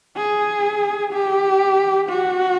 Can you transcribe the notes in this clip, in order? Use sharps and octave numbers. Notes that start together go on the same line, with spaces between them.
G#4
G4
F#4